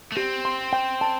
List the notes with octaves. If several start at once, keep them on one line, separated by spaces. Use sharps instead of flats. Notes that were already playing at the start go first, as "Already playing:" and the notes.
A3
C4 G4
C6
G5
A5